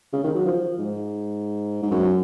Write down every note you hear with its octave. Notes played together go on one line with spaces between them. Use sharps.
C#3
D#3
F#3
F3
G#2
G#2
F#2